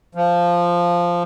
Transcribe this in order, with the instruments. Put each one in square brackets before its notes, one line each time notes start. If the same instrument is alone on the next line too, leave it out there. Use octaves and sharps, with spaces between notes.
[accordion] F3